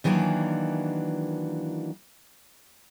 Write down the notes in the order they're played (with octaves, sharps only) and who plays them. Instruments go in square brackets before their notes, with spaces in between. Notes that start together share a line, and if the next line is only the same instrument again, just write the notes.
[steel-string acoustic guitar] D#3 E3 F#3 A#3 D4